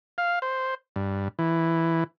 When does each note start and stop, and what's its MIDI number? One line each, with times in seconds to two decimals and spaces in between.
0.18 0.39 77
0.42 0.74 72
0.96 1.28 43
1.39 2.04 52